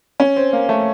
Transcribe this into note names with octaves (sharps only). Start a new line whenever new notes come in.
C#4
C4
A#3
A3